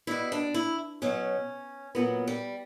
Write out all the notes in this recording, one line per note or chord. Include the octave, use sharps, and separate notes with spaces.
B2 G3 E4
D4
E4
B2 F#3 C#4
A#2 F#3 B3
G3